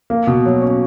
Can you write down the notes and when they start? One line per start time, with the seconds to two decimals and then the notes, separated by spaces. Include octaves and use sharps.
0.10 A#3
0.27 B2
0.46 F#3
0.62 C#4